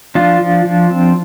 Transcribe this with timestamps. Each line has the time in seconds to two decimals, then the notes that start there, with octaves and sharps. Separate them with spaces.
0.15 F3 D4 F4
0.41 F3
0.65 F3
0.90 C4